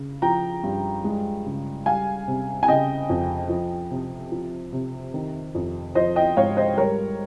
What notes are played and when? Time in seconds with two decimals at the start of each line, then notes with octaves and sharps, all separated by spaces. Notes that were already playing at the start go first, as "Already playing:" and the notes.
Already playing: C#3
0.22 F3 G5 A#5
0.63 G2
1.04 G#3
1.46 C#3
1.86 G3 F5 G#5
2.27 C3
2.63 G#5
2.68 C#3 D#5 G5
3.10 F2
3.49 F3
3.91 C3
4.32 F3
4.72 C3
5.14 D#3
5.55 F2
5.95 F3 C5 D#5
6.16 D#5 G5
6.36 G#2 C#5 F5
6.57 C5 D#5
6.77 G3 A#4 C#5